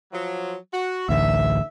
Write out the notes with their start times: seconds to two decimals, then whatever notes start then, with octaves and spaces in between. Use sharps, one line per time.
0.12 F3 F#3
0.72 F#4
1.09 A1 D2 E5